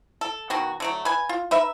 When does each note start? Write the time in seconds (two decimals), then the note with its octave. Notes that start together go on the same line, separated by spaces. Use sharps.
0.21 A4
0.50 B2 D#3 F#4
0.80 D3 F#3 A3
1.05 B4 G#5
1.29 F4
1.51 D#4 B4 E5